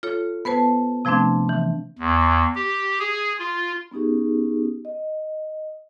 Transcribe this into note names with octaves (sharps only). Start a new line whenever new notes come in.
F4 A4 C#5
B3 B4 C5 A5
C3 F3 A3 C4 D4
E3
E2
G4
G#4
F4
B3 C#4 D#4 G4 G#4
D#5